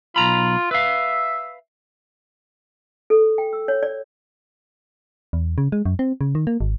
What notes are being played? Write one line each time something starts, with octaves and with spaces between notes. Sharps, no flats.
B1 F4 A#5 B5
B4 E5 F5
A4
G5
E6
C#5
D5
E2
C#3
G#3
F#2
C4
C#3
D#3
A#3
G#1